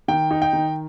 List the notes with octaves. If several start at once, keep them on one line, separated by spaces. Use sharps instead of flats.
D#3 G5
D#4
G5
D#3